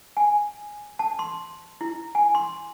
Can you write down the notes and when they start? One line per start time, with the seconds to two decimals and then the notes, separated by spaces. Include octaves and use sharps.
0.17 G#5
0.99 A5
1.19 C6
1.81 E4
2.15 G#5
2.35 C6